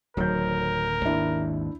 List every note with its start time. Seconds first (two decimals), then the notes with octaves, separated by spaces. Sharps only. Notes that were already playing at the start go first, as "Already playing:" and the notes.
0.17 D1 D#3 F#3 A#4 G6
1.05 G#1 D#2 D4 E4